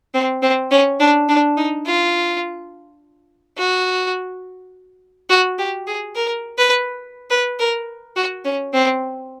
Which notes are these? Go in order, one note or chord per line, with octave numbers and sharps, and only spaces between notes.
C4
C4
C#4
D4
D4
D#4
F4
F#4
F#4
G4
G#4
A#4
B4
B4
A#4
F#4
C#4
C4